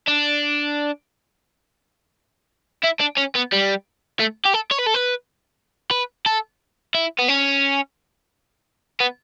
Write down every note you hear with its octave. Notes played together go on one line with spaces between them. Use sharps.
D4
E4
D4
C#4
B3
G3
A3
G4
A4
C#5
B4
A4
B4
B4
A4
E4
B3
C#4
B3